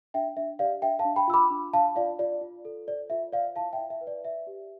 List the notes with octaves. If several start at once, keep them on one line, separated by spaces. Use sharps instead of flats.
D4 E5 G5
D4 E5
G4 D5 F5
D4 E5 G5
F5 A5
D4
G5 B5
F4 E6
B5 D6
D4
D4 F5 A5
F4 D5 F5
F4 D5
F4
A4
C5 D5
F4 E5
C5 D5 F5
E4 F5 A5
E5 G5
E4
E5
B4
D5
D5 E5
G4